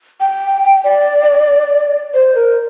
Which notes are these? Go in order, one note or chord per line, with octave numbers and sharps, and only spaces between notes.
G5
D5
C5
A#4